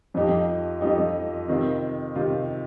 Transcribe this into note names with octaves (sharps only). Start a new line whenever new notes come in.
F2 F3 D#4 G4
F2 F3 D#4 G4
C3 D#3 C4 F4
C3 D#3 C4 F4